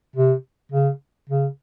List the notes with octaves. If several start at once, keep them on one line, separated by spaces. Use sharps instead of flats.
C3
C#3
C#3